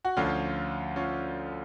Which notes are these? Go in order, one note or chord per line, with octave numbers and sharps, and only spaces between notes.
F#4
D2 D3 F3 C#4 F4
C#4 F4